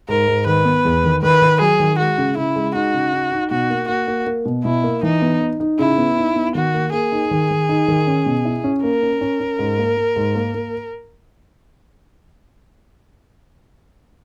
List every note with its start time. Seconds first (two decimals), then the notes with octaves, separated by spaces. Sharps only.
0.09 G#2 A#4
0.28 G#2
0.47 D#3 B4
0.65 B3
0.85 E2
1.04 D#3
1.23 D#3 B4
1.42 D#3
1.61 F#3 G#4
1.80 D#3
1.99 G#3 F#4
2.18 C#3
2.37 C#3 E4
2.56 G#3
2.75 D#4 F#4
2.94 C#3
3.13 D#4
3.32 D#4
3.51 B2 F#4
3.70 A#3
3.89 A#3 F#4
4.08 A#3
4.27 A#3
4.45 B2
4.65 B2 E4
4.84 A#3
5.03 E3 D#4
5.22 B3
5.41 D#4
5.60 D#4
5.79 C#3 E4
5.98 B3
6.17 D#4
6.36 B3
6.55 D#3 F#4
6.74 A#3
6.93 A#3 G#4
7.12 D#4
7.31 D#3
7.50 D#3
7.69 D#4
7.88 D#3
8.07 C#4
8.26 B2
8.45 E4
8.64 C#4
8.83 A#3 A#4
9.02 C#4
9.21 C#4
9.40 C#4
9.59 G#2
9.78 A#3
9.97 A#3
10.16 G#2
10.35 A#3
10.54 A#3